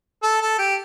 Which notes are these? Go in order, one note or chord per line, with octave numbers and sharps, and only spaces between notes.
A4
A4
G4